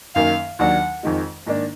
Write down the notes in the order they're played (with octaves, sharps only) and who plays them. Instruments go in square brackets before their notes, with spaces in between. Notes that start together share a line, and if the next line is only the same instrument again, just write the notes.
[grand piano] F#2 D#3 A#3 [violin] F5
[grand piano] D#2 D#3 F#3 D4 [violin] F#5
[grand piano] F2 D#3 G#3
G#2 D#3 A#3 D4